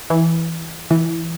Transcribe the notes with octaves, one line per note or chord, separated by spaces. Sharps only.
E3
E3